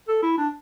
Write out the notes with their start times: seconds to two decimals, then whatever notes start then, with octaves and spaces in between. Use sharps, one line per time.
0.08 A4
0.23 E4
0.38 D4